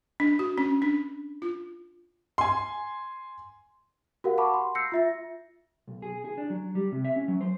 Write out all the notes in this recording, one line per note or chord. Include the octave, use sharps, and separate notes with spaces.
D4
F#4
C#4
D4
F4
G#5 C6
F#4 G4 A#4 F5 F#5
F5 F#5 A5 B5 C#6 D6
C6
E6 G6 A#6 C7 C#7
F4 E5 A#6
B1
G#4
G#4
D4
F#3
G3
C3
E5
C#4
F#3
C5